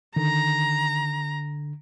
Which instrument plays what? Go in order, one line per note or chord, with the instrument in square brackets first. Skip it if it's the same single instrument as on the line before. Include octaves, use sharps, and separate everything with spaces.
[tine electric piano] D3 [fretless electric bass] D#3 [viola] A#5